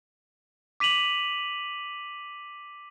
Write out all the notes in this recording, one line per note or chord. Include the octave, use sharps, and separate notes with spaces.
D6 B6 D#7 F7 F#7